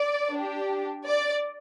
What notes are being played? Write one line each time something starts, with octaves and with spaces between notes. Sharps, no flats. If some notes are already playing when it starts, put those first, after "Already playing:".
Already playing: D5
D4 G4
D5